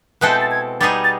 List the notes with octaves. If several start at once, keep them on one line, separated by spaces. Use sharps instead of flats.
B2 G#3 C4 E4 A4 F#6
G6
A6
G#6
G3 B3 D#4 G#4 A6
A6